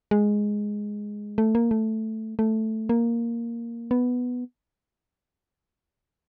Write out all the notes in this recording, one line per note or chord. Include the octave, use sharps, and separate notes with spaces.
G#3
A3
A#3
A3
A3
A#3
B3